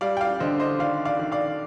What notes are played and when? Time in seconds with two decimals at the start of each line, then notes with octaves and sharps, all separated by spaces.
0.01 G3 D5 F5
0.17 G5
0.21 D5 F5
0.40 D3 C5 D#5
0.60 C5 D#5
0.79 D#3 D5 F5
1.05 D5 F5
1.19 D#3
1.32 D5 F5